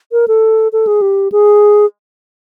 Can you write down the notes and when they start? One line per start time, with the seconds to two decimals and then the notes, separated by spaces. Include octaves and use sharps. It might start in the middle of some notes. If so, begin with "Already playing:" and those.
0.12 A#4
0.28 A4
0.73 A4
0.87 G#4
1.02 G4
1.32 G#4